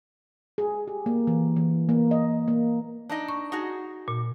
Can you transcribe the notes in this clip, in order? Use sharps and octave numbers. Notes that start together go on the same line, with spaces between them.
G#4
G4
A#3
E3
E3
A#3
D#5
A#3
D4 D#4 D#5
C#6
D#4 F#4 G#4
A#2